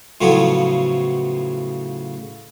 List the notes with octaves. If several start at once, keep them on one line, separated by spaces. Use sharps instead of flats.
A2 C#3 F3 F#3 B3